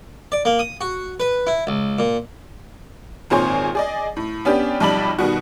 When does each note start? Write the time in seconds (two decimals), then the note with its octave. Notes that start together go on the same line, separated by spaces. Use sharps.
0.32 D5
0.45 A#3
0.59 D#6
0.81 F#4
1.20 B4
1.47 E4
1.67 C#2
1.99 A#2
3.30 G#1 A#2 C4 G#4 C#5 C6
3.75 G#4 D5 D#5
4.17 A2
4.45 B3 C#4 D4 G4
4.80 B1 F2 G3 D5 B5 F#7
5.19 B2 D#3 G3 F#4